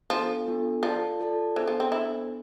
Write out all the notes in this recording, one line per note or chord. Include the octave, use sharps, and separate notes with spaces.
F3 B3 D4 F4 A4
B3 D4 F4 A4
F3 F4 A4 D5 A5
F4 A4 D5 A5
E3 B3 D4 A4 C5
F3
C4
B3 D4 E4 A4 C5